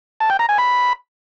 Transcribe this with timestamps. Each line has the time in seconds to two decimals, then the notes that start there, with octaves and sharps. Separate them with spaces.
0.20 A5
0.30 G5
0.39 A#5
0.49 G#5
0.58 B5